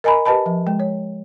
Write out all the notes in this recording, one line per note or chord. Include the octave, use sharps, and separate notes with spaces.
A#4 D#5 G#5 A#5 B5
G4 B4 D#5 A5 B5
F3
G#3
C#5